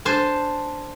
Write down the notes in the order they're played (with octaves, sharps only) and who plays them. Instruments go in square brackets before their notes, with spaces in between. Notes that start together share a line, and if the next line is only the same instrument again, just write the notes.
[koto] D4 C5 G#5 A5